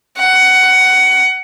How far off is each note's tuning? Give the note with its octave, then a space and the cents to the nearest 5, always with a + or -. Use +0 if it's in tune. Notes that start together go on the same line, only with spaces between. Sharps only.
F#5 +15